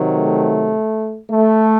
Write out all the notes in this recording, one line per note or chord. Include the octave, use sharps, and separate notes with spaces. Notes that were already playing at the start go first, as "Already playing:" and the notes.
Already playing: C3 D#3 F#3
A3
A3